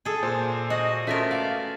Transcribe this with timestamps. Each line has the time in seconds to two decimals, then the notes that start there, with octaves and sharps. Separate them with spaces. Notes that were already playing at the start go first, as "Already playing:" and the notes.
0.05 G#4 A4
0.23 A#2 C5 C6
0.70 F#4 D#5
1.07 A3 B3 C#4 F4 A#4 E5 B6
1.31 D5 F5